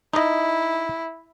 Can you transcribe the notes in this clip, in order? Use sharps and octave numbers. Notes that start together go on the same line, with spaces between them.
D#4 E4 D#5